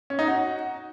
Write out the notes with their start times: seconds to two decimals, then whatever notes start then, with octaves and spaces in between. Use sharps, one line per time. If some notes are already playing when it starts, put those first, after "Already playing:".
0.10 C#4
0.19 D#4
0.27 F#4